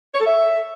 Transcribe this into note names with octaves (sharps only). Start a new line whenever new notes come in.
C#5
A4
E5